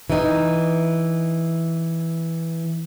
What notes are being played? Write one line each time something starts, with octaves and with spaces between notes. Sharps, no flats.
E3 D#4